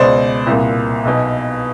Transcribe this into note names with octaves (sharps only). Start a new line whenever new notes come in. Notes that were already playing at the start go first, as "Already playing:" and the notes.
Already playing: C#2 B2 C5 D5
C2 A#2
B1 B2